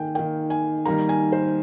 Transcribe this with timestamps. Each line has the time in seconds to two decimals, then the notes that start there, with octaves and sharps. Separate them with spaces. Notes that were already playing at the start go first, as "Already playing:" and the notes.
Already playing: D#3 A#3 G5 G#5
0.15 D#3 A#3 G5
0.50 G#5
0.86 D#3 G3 A#3 A#5
1.09 G#5
1.32 C5